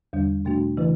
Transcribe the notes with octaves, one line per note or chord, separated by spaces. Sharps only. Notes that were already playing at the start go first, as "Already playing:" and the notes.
E2 D3 G3 D4
B2 A3 D4 F#4
C#3 E3 A3 E4 B4